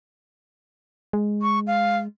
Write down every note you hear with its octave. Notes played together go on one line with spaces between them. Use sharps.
G#3
C#6
F5